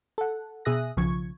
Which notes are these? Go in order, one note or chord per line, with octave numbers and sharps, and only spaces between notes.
A4 F#5
B2 G#4 E5 D#6 F#6 A#6
B1 C#3 F3 C#6 G#6